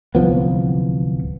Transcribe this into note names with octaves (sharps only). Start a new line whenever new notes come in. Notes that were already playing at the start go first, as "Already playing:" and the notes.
D1 C2 F3 B3